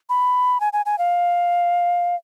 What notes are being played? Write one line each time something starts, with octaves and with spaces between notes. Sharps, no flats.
B5
G#5
G#5
G#5
F5